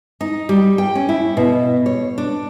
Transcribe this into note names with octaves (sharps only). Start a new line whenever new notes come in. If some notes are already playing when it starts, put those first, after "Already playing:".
D#4
G3
G5
C#4
E4
B2
C#5
D4